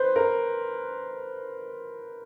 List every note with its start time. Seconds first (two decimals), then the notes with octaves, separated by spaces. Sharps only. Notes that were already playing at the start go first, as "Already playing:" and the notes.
Already playing: B4 C5
0.16 A#4